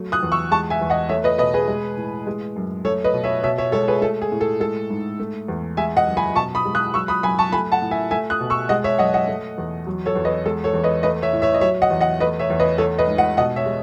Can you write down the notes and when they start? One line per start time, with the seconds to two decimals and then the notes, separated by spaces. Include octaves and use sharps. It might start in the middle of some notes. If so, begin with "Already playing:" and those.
Already playing: F#3 A3
0.12 D#6 F#6
0.23 E2
0.32 C#6 E6
0.51 G#3 A5 C#6
0.70 E5 G#5
0.81 E2
0.90 D#5 F#5
1.09 A3 C#5 E5
1.24 B4 D#5
1.38 B2 B4 D#5
1.54 G#4 B4
1.68 G#3
1.97 A2
2.27 G#3
2.56 F#2
2.85 A3 A4 C#5
3.04 B4 D#5
3.14 B2
3.24 C#5 E5
3.43 B2 C#5 E5
3.58 C#5 E5
3.72 G#3 A4 C#5
3.88 G#4 B4
4.01 A3 A4
4.22 G#4
4.32 A2
4.41 A4
4.60 G#3 A4
4.90 G#2
5.20 A3
5.48 E2
5.77 G#3 E5 G#5
5.97 D#5 F#5
6.07 F#2
6.17 G#5 B5
6.35 B2 A5 C#6
6.55 B5 D#6
6.65 G#3
6.75 D#6 F#6
6.94 F#3 C#6 E6
7.08 B5 D#6
7.23 F#2 G#5 B5
7.39 A5 C#6
7.52 A3 G#5 B5
7.72 F#5 A5
7.82 A2
7.91 E5 G#5
8.11 A3 E5 G#5
8.30 D#6 F#6
8.40 B2
8.50 C#6 E6
8.69 G#3 D#5 F#5
8.84 C#5 E5
8.99 F#2 D#5 F#5
9.14 D#5 F#5
9.27 A3
9.58 E2
9.87 F#3
10.06 A4 C#5
10.15 E2
10.25 B4 D#5
10.46 G#3 A4
10.64 A4 C#5
10.74 E2
10.83 B4 D#5
11.03 A3 B4 D#5
11.22 C#5 E5
11.33 A2
11.42 C#5 E5
11.54 D#5
11.61 F#3 C#5 E5
11.82 D#5 F#5
11.91 E2
12.01 D#5 F#5
12.20 A3 B4 D#5
12.39 C#5 E5
12.50 E2
12.60 B4 D#5
12.78 A3 A4 C#5
12.98 B4 D#5
13.07 G#2
13.18 D#5 F#5
13.37 B2 D#5 F#5
13.56 C#5 E5
13.66 G#3